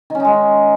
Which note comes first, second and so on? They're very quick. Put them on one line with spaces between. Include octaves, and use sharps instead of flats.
D#3 C#4 D#4 G#3